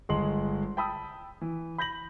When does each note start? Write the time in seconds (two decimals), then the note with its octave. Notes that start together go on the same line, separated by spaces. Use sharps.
0.09 G1 G#3 C6 F#7
0.77 G5 A5 B5 D#6 E6
1.41 E3
1.78 B5 G6 A#6 F#7